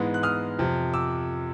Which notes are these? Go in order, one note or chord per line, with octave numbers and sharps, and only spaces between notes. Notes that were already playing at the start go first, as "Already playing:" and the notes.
Already playing: G#2 E3 G#3 B3
F#6
D#6 F6
F2 C3 F3
D6 E6